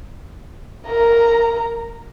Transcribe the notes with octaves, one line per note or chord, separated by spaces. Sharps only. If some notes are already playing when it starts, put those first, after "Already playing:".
A#4 A#5